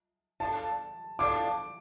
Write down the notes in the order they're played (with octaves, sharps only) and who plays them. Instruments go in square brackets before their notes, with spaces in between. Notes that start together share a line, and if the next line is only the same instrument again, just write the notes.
[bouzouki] F3 D4 F4 A4 [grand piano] A5
[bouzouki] A2 F3 D4 A4 [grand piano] D6